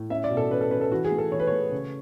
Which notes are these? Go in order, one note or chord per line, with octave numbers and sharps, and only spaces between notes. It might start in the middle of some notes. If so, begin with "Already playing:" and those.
Already playing: A2
C#4 E5
D5
B2
A4
C#4 B4
A4
C#4 B4
A4
E3 F#4
G#4
A3
A4
E3 C#5
B4
A3 C#5
C#3